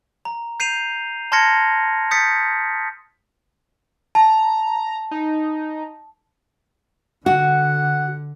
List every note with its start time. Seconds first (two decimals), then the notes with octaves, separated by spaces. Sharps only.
0.25 A#5
0.60 G6 C7 D#7 F7
1.32 A5 C6 F6 G#6 A#6 C#7
2.11 D#6 G6 A6 B6 C#7
4.15 A5 A#5
5.11 D#4
7.26 D3 F#4 F#5